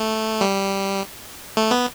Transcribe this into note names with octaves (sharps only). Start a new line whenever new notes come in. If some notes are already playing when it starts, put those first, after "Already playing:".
Already playing: A3
G3
A3
B3